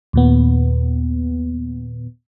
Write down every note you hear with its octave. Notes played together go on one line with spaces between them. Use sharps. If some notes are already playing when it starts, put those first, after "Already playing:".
D#2 A#2 B3